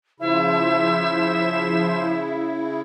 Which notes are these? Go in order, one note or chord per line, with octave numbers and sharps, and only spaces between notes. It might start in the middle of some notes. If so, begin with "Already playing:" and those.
C#3 F3 E4 C5 E5 E7